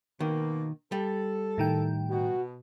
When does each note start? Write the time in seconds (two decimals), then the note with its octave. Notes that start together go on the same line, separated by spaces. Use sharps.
0.20 B2 D#3 A#3
0.92 G3 A4
1.58 A2 D#3 G5
2.10 B2 F#4